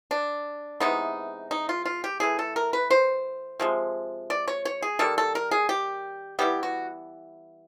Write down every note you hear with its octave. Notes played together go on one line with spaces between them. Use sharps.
D4
C3 E3 G#3 B3 D#4
D#4
F4
F4
G4
E3 A3 G#4
A4
A#4
B4
C5
C3 F3 G#3
D5
C#5
C#5
G#4
D#3 G3 A#3 A4
A4
A#4
G#4
G4
E3 G3 B3 G4
F#4